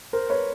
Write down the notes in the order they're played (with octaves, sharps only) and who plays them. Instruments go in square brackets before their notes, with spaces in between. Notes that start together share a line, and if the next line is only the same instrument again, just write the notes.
[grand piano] A#4 C5
B4 C#5